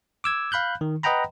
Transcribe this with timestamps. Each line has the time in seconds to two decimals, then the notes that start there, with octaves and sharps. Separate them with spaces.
0.24 D6 E6 G#6
0.52 F5 B5 F#6 G6
0.81 D#3
1.03 B4 D#5 F#5 G5 A#5 B5